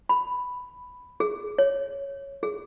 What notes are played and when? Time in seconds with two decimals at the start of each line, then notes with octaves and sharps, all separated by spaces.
0.09 B5
1.20 G#4
1.58 C#5
2.43 G#4